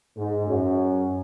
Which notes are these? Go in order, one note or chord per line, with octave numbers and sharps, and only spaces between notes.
G#2
F#2